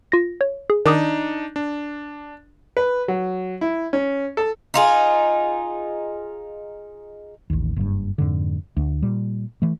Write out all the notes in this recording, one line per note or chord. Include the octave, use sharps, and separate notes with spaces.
F4 A#6
C#5
G#4
D#3 D4 D#4 D6 D#6
D4
B4
F#3
E4
C#4
A4
D#4 F4 G#4
A1 D#2
F#1 G2
F2 G#2 D3
D2
A#2 G3
E3 A3